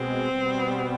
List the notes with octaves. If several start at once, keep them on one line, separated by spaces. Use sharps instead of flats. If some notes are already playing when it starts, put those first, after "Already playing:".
Already playing: B2 G#3 C4
B2 G3 B3